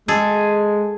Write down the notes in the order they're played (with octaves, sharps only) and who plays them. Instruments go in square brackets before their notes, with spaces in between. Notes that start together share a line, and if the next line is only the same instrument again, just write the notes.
[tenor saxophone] G#3 [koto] G#4 A4